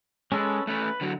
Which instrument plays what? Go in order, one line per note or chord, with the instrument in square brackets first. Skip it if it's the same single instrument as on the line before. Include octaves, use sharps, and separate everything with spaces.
[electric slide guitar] G#3 [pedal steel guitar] C#4 A4 B4
[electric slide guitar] A3 C#4 [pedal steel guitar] B4
[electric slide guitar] D3 F#3